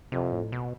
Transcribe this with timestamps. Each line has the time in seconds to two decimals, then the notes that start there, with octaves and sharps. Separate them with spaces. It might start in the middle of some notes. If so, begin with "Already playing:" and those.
0.12 F2 C3
0.32 A2
0.52 B2